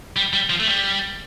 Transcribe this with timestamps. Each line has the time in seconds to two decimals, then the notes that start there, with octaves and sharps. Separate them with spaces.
0.16 G3
0.33 G3
0.50 F3
0.60 A3
0.67 G3